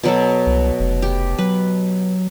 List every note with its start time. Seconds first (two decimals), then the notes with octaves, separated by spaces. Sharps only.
0.03 B2 F#3 A4
0.46 C2
0.80 F1
1.02 G4
1.38 F#3 B4